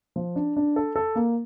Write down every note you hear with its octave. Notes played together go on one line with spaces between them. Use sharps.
F3
D4
D4
A4
A4
A#3